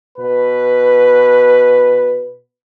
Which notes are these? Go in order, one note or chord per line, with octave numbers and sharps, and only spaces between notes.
B2 B4